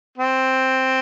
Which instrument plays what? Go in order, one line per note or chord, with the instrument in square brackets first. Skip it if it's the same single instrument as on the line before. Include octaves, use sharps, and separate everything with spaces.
[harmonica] C4